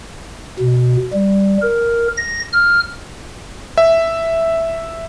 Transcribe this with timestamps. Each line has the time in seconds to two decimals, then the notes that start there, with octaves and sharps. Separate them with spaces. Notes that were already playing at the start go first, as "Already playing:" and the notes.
0.59 B2
1.13 G3
1.62 A#4
2.17 A#6
2.53 F6
3.78 E5